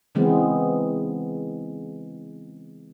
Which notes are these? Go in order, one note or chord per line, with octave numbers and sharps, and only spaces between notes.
C#3 E3 G#3 B3 C4